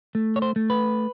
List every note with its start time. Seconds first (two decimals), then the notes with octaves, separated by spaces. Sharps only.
0.15 A3
0.36 C#5
0.42 C5
0.56 A3
0.70 B4